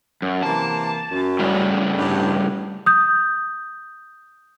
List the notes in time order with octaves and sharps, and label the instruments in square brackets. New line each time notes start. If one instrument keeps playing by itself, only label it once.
[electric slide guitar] F#2
[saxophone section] C3 E3 A#3 [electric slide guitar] A5
[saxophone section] F#2
[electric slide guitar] A2 C#3 G3
[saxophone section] G2
[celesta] D#6 G6